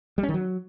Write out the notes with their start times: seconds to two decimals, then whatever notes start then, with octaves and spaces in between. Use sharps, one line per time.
0.18 G3
0.23 C#4
0.29 D#3
0.34 F#3